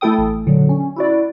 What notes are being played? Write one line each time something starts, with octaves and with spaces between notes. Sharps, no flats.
A3 E4 A4 G5 D#6
A1
A#2 D3 F#3
C#4
E4 F#4 D5